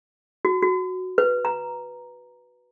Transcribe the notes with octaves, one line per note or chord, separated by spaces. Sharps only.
F#4
F#4
B4
A#5